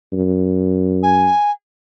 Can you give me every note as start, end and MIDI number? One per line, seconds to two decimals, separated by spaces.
0.13 1.29 42
1.03 1.51 80